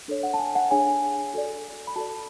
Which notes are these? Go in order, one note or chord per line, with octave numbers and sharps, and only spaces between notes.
D4 A4 C#5
F#5
A5
G#5
F#5
D4 G#4 C#5 G#5
F#4 A4 D5
B5
F#4 A4 D5 A5